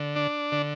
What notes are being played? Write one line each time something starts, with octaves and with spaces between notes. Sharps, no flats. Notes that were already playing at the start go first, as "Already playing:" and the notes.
Already playing: D3
D4
D3